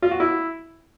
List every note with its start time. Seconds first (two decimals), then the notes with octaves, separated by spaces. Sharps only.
0.02 F4
0.11 F#4
0.20 E4